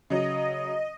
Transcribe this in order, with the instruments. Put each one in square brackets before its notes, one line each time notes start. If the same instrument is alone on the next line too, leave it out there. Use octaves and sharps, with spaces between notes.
[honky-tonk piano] C#3 F#3 [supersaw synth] D#5